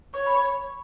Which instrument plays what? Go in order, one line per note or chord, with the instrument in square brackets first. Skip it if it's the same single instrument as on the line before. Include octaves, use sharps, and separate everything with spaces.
[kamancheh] C#5 [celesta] C#6
[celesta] B5